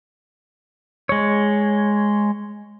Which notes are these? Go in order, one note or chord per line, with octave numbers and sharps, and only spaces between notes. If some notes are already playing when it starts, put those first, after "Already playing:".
G#3 C#5